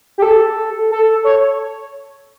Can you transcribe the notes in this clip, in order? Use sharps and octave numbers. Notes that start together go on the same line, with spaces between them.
G4
A4
A4
C#5